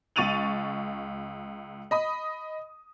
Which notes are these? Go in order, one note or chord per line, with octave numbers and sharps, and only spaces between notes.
C#2 C#6 A6 D#7 F7 F#7
D#5 B5 D#6